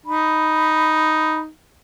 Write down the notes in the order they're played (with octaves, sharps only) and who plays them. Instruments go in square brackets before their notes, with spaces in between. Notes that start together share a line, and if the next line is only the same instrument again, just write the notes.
[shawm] D#4 [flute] B5